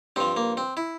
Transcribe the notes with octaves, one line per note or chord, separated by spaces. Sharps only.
G2 F3 C4
A#3
C4
E4